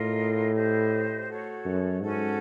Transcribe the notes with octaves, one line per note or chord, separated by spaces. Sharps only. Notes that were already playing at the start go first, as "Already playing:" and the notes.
Already playing: A2 F4 A#4 D#5
E4 G4 C5 D#5
F#4 A4 C#5
F#2
G#2 C#4 F#4 A4